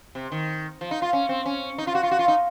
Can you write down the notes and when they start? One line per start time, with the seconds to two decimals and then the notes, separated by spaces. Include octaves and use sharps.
0.15 C3
0.32 D#3
0.81 F3
0.91 D#4
1.02 F4
1.13 C#4
1.29 C4
1.46 C#4
1.78 D#4
1.87 F4
1.95 F#4
2.03 F4
2.11 F#4
2.19 F4
2.28 D#4